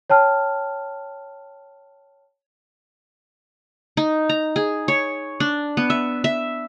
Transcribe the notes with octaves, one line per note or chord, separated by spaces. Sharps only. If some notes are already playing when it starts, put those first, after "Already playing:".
C#5 G5 A5 F6
D#4
A#5
G#4
C#5
D4
B3
E5
E5